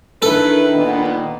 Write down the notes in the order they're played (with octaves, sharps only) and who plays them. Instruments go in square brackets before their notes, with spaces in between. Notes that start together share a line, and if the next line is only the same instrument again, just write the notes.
[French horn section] D#3 E4 B4 [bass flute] D4 [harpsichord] A4
[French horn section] A#2 D#3 B3